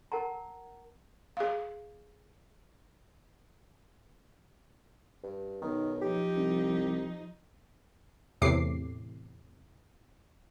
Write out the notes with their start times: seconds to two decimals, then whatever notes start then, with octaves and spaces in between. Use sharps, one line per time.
0.12 A#4 F#5 A5 A#5
1.37 G#4 F5
5.23 G2
5.62 B1 D#3
6.02 F3 D#4 G4
6.37 C2
8.41 E2 A2 C3 D6 C7